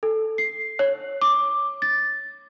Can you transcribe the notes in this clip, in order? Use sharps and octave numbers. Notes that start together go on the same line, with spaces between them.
A4
C7
C#5
D6
A6